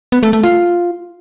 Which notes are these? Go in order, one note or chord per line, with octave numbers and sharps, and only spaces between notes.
B3
A3
A3
F4